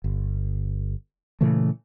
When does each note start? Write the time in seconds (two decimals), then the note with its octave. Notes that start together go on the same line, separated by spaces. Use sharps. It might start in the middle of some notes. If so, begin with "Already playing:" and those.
0.04 G1
1.41 A#2 C#3 E3 A3